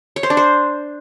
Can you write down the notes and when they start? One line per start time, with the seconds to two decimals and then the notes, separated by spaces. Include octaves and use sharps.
0.16 C#5
0.23 C5
0.30 D4
0.37 C5